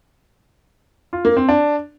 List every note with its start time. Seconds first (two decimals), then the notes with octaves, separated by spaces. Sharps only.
1.13 F4
1.25 A#3
1.37 C4
1.49 D4